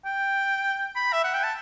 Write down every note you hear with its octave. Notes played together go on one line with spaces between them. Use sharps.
G5
B5
E5
F#5
G5
A5